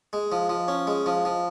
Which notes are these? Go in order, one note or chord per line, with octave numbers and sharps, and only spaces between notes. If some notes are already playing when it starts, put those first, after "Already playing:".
G#3
F3
F3
C#4
G#3
F3
F3